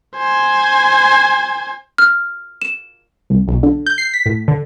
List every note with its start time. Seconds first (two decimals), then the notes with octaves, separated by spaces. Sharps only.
0.16 C5 G#5
1.98 F6
2.62 E7
3.30 C2
3.48 B1
3.63 D3
3.86 G6
3.98 C7
4.14 B6
4.26 A2
4.48 D3